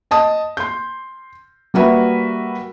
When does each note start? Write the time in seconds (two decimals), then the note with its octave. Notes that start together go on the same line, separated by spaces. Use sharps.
0.11 D#5 A5 D#6
0.57 C6 G6
1.74 G3 A#3 F#4 B4 E5